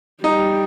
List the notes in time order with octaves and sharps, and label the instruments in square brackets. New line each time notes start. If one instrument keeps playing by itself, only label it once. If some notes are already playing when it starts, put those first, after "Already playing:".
[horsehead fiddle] G3 [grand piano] D#4